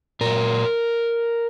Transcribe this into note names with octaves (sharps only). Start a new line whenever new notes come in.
A#2 F#3 A#4